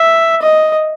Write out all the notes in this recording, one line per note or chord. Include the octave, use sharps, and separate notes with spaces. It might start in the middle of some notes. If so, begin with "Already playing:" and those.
Already playing: E5
D#5